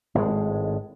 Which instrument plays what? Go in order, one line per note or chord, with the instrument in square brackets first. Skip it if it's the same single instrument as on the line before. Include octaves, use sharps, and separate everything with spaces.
[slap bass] G#1 A2 D3 G#3